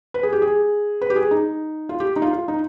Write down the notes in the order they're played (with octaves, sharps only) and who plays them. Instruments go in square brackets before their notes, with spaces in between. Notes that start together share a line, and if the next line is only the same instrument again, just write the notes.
[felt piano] B4
G#4
G4
G#4
B4
G4
G#4
D#4
F4
G4
D#4
F4
F4
D#4